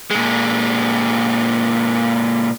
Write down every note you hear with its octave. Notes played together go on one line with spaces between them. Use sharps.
A#2 G#3